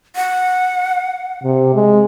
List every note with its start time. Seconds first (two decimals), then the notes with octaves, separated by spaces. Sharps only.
0.16 F#5
1.44 C3
1.75 G#3